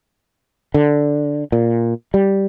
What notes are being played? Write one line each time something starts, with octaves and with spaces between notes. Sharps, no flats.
D3
A#2
G3